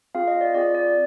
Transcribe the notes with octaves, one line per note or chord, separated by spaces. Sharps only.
C4 F4 G#4 F5
D#5
D5
C4 F4 G#4 D5
D5